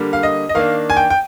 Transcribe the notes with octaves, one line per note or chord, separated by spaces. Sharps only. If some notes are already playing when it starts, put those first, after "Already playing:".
Already playing: D3 G3 A#3
F5
D#5
D#5
D#3 A#3 D4 F5
G#5
G5
G5